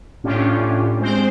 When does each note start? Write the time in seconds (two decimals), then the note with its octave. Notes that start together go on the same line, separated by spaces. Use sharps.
0.24 A2 C#4 D4 F4 G4
0.99 G#3 C4 C5